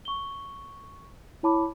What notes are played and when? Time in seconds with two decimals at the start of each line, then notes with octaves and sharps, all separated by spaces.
0.05 C#6 G7
1.43 E4 C#5 A5 B5 D6